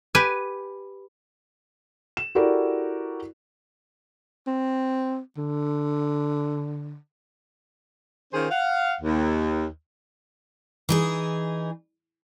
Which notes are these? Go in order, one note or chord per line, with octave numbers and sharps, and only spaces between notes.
G4 B4 G#5
E7
E4 F#4 G4 A4 A#4 D5
C4
D3
D#3 C#4 F4 G#4 C5
F5 F#5
D#2
E3 D#4 G#4